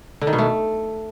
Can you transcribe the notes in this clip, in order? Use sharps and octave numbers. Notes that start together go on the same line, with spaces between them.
D3
D#3
B2
A3